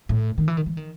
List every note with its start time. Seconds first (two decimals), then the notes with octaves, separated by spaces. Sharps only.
0.09 A2
0.38 D#3
0.48 E3
0.57 D#3
0.66 E3
0.77 D#3